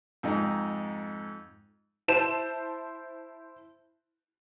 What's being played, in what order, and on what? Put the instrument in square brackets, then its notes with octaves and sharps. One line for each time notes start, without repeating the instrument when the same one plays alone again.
[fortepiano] F2 G#2 D#4
[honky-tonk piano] E4 C5 A5 E7